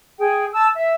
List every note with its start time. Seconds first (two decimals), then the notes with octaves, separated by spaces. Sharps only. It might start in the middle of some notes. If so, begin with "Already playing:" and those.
0.19 G#4 G5
0.53 A5 E6
0.74 E5